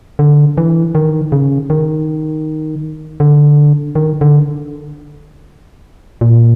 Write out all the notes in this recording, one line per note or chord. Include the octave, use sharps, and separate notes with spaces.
D3
E3
D#3
C#3
D#3
D3
D#3
D3
A#2